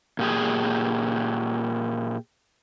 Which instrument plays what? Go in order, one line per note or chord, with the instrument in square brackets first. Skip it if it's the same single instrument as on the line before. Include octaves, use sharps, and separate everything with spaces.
[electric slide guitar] A#2 G4 G#4